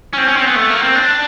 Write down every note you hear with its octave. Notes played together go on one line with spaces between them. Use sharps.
C#4
C4
C#4
C4
B3
A3
A#3
C4
D4